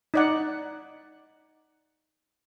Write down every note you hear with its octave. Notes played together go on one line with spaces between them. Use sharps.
D#4 D5 F#5